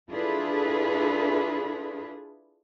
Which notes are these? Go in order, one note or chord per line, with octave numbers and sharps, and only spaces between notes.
D4 E4 F4 G#4 A4 B4